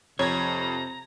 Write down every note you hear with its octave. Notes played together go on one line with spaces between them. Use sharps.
F2 C3 C#5 A#5 G#6